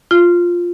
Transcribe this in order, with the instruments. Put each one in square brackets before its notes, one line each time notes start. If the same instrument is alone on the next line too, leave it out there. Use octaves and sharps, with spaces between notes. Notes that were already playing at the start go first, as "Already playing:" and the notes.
[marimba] F4